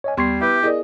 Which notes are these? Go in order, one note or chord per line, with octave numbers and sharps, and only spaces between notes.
C#5 D#5 G#5
D#2 G3 B3 C6 C#6 G#6 C7
E4 G4 B4 E5
E4 G#4 A#4 D5 D#5